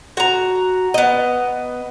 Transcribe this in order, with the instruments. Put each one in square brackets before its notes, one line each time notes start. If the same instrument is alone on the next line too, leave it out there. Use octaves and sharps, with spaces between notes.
[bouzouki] F#4 A#5
B3 D#5